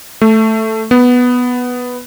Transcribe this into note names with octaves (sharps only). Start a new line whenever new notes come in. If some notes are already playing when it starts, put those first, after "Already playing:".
A3
B3